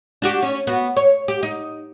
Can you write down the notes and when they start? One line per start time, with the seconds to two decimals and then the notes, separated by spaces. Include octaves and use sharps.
0.22 D4 F#4 G4
0.42 C#4
0.67 B3 F#4
0.97 C#5
1.28 G4
1.43 D#4